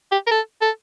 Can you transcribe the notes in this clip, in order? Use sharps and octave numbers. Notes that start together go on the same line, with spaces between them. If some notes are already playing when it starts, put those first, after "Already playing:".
G4
A#4
A4
A4